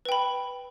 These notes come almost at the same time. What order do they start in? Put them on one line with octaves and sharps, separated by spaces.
B4 G5 B5